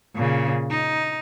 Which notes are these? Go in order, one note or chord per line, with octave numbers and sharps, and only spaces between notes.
A#2 C#3
D#4